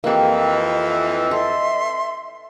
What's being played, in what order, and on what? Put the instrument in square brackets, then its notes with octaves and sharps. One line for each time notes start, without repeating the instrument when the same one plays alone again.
[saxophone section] F2 E3 [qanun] A#3 G4 [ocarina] D#5
[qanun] A4 [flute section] E5 C6